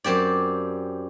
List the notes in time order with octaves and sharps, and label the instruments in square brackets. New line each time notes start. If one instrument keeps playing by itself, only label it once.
[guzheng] F#2 C4 G4 D5